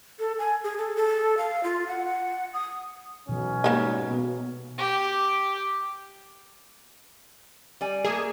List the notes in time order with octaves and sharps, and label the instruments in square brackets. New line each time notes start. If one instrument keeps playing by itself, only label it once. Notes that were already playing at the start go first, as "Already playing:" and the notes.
[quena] A4
G#5
G#4
A4
A4
F5
F4
F#5
D#6
[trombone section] B1 F#3 C#4 [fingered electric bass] B2 E3
[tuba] G#2 [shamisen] G3 A#3 D#5
[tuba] B2
[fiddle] G4
[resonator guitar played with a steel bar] G3 D5 G#5
[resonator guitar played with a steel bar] A3 A#3 [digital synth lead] G#4